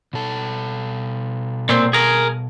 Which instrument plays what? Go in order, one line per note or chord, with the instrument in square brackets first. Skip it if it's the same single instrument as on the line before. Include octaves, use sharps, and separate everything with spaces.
[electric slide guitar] B2 A4
[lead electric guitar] A#2 C4
G#4 A#4